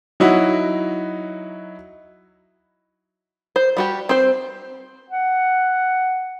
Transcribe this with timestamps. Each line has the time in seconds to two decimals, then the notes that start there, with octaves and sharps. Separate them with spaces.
0.20 F#3 D#4 E4 F#4
3.56 C5
3.77 G3 F#4 G4
4.09 C4 C5
5.10 F#5